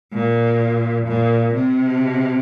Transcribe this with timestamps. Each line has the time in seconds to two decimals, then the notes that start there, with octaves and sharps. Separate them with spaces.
0.13 A#2
1.07 A#2
1.54 C3